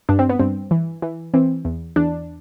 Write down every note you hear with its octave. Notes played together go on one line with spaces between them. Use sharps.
G2 D4
C4
B3
G2 C4
E3
E3
E3 C4
E2
E2 D4